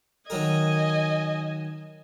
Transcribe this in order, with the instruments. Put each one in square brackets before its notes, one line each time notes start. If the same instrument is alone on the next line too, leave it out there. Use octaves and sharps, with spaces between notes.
[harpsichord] D#3 F#3 A#4 [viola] D#5 G#5